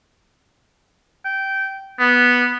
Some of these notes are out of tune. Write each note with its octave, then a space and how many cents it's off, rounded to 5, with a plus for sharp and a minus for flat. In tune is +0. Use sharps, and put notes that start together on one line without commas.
G5 -15
B3 -5